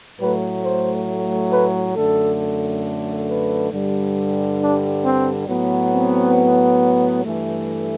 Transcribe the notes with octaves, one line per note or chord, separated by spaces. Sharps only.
A2 F#3 A3 B4
C5
B4
F#2 D3 A3 A4
B4
G2 D3 G3
D4
C4
A2 F#3 B3
C4
G2 E3 A3